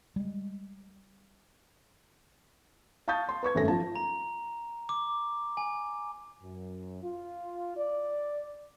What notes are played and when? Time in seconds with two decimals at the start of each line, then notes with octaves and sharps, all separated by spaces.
0.16 G3 G#3
3.08 F5 A5 C#6 D#6 G6 A6
3.29 C6
3.43 B4 C#6 G#6
3.55 G#1 F#2 A3 C#4 A#6
3.68 F3 A5
3.96 A#5
4.89 D6
5.57 G#5
6.43 F#2
7.03 F4
7.78 D5